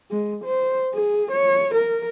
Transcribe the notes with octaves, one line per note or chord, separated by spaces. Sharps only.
G#3
C5
G#4
C#5
A#4